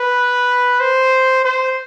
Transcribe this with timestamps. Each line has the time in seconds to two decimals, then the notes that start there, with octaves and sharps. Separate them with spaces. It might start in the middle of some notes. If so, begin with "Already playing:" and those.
Already playing: B4
0.80 C5
1.45 C5